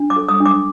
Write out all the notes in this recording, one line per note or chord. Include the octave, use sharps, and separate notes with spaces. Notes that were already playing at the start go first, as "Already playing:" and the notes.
Already playing: D4
D6
A4
D#6
D4
D6